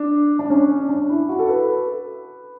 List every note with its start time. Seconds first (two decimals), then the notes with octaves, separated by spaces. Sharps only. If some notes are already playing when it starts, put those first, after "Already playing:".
Already playing: D4
0.39 D4
0.50 C#4
0.89 D4
1.09 E4
1.29 F#4
1.39 A4
1.49 B4